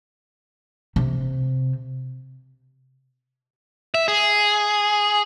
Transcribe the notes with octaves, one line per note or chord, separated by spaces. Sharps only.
C3
E5
G#4